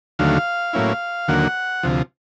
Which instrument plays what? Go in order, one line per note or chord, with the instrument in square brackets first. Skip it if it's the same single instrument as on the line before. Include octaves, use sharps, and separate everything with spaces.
[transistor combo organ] D#2 D3 F#3 A3 F5
A2 F#3 A#3 C#4 E4
D#2 D3 F#3 A#3 F#5
D2 C3 F3